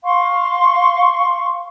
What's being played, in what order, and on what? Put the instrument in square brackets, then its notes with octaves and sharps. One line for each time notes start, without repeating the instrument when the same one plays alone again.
[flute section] F5 C6 C#6